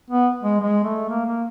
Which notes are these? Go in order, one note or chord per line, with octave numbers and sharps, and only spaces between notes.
B3
G#3
G#3
A3
A#3
A#3